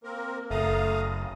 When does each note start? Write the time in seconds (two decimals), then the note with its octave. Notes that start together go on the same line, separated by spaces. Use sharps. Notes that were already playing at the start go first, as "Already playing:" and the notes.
0.03 A#3 C4 A#4
0.51 F#1 A3 F5 A#5 D#6